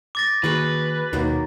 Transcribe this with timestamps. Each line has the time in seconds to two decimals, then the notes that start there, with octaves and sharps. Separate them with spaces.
0.15 D6 A6 A#6
0.44 D#3 A#3 F#4 G#4 B4 C#5
1.13 D#2 B2 D#3 F#3 A#3